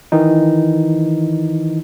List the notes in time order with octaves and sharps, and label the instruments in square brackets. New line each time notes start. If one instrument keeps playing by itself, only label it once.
[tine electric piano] D#3 E3 D#4